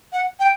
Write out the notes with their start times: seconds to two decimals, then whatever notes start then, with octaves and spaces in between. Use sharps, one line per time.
0.13 F#5
0.39 G5